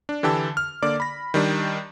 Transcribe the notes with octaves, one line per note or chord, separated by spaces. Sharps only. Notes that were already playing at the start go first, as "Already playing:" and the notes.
D4
D3 E3 G4 A5 E6
F6
D3 A#3 D5 D6
B5 A#6
D#3 G3 D4